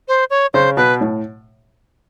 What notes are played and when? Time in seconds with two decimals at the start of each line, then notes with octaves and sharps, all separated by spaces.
0.08 C5
0.30 C#5
0.54 C#3 C5
0.77 B2 B4
1.01 A2